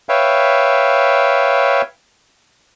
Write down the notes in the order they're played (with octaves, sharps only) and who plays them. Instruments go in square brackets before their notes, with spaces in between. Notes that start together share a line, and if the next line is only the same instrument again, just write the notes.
[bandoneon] B4 C#5 E5 F5 G5